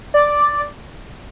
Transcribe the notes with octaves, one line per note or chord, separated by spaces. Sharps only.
D5